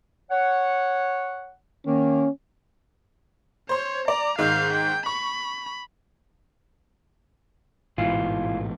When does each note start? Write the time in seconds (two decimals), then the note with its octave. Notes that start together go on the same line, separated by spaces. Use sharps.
0.31 C#5 F#5
1.86 D#3 A#3 C#4
3.69 C5 C#5 C6
4.08 D5 A#5
4.39 G#2 D#3 F5 G6
4.73 G5
5.06 B5 C#6
7.98 A1 G#2 B2 E3 F4